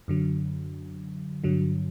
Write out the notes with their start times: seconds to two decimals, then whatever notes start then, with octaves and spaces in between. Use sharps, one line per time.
0.08 F#2 D3 F#3
1.44 G2 D3 F#3